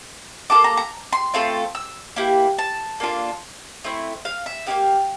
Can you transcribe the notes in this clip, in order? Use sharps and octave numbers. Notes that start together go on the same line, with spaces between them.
A#3 F4 A4 D6
A#5
A#5
C6
A3 C4 F4 A4
E6
A#3 E4 G4
A5
A#3 D4 F4 A4
A3 C4 E4
F5
E5
A#3 E4 G4 F5